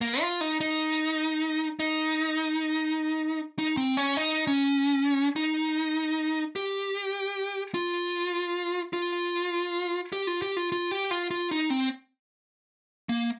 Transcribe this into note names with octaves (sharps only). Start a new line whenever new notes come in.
A#3
F4
D#4
D#4
D#4
D#4
C4
C#4
D#4
C#4
D#4
G4
F4
F4
G4
F4
G4
F4
F4
G4
F4
F4
D#4
C4
A#3